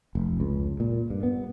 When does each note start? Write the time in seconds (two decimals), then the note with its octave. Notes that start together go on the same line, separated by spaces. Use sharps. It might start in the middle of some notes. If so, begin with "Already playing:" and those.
0.15 F1
0.40 C#2
0.80 A#2
1.10 G2
1.23 B3